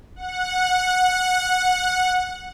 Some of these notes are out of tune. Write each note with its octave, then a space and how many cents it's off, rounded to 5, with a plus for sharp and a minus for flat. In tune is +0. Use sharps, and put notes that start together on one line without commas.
F#5 -15